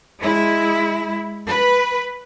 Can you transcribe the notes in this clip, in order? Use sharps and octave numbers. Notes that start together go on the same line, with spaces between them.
G#3 E4
B4